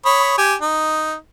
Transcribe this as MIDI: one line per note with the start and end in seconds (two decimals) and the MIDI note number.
0.05 0.35 73
0.05 0.35 83
0.05 0.35 87
0.38 0.54 67
0.38 0.54 80
0.62 1.15 63